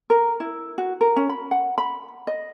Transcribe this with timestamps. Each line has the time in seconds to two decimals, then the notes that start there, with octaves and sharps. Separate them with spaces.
0.10 A#4
0.40 E4
0.78 F#4
1.01 A#4
1.16 C#4
1.29 B5
1.51 F#5
1.78 B5
2.27 D#5